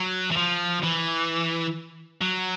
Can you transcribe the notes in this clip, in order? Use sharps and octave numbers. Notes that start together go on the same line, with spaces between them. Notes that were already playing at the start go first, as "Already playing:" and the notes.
Already playing: F#3
E3
F3
E3
F#3